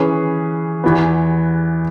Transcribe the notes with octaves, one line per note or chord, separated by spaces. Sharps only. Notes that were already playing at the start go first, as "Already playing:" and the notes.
Already playing: E3 C#4 G#4 B4
E2 E3 B3